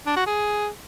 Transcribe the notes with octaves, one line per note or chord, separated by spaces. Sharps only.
D4
F#4
G#4